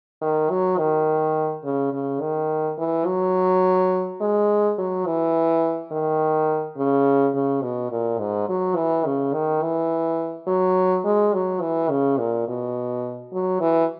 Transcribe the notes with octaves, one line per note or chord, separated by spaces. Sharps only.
D#3
F#3
D#3
C#3
C#3
D#3
E3
F#3
G#3
F#3
E3
D#3
C#3
C#3
B2
A#2
G#2
F#3
E3
C#3
D#3
E3
F#3
G#3
F#3
E3
C#3
A#2
B2
F#3
E3